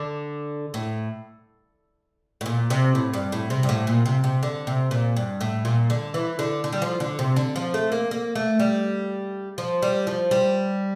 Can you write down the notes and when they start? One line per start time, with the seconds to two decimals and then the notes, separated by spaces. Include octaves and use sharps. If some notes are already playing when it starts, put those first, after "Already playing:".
Already playing: D3
0.74 A2
2.41 A2
2.46 A#2
2.70 C3
2.95 A2
3.14 G2
3.32 A2
3.50 C3
3.63 G2
3.69 A2
3.87 A#2
4.06 C3
4.24 C3
4.43 D3
4.67 C3
4.91 A#2
5.16 G2
5.41 A2
5.65 A#2
5.90 D3
6.14 E3
6.39 D3
6.64 D3
6.73 G3
6.82 F3
7.00 D3
7.19 C3
7.36 D3
7.56 F3
7.74 A3
7.92 A#3
8.11 A#3
8.35 A3
8.60 G3
9.58 F3
9.82 G3
10.07 F3
10.31 G3